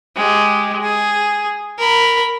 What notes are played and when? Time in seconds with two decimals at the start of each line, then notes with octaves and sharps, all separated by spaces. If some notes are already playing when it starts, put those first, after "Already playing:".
0.16 G#3 G4
0.81 G#4
1.78 A#4 B5